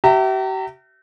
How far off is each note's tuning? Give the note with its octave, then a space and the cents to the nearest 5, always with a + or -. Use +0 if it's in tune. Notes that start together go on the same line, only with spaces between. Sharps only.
G4 -45 E5 +0 A#5 -35